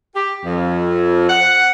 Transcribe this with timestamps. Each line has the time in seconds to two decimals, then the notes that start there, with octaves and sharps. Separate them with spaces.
0.15 G4
0.45 F2
1.29 F#5